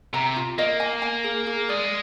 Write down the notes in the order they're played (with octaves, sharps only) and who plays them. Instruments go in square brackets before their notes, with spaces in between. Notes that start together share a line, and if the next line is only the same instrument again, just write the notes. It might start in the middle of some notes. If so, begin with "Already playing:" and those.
[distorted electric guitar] C3 [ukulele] A#5
[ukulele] F4
[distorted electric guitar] A#3 [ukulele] D#5
[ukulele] G#5
G#5
G#4
G#4
[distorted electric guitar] G#3 [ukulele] D5